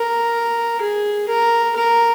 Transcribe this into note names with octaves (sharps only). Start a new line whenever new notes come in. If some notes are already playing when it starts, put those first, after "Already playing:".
Already playing: A#4
G#4
A#4
A#4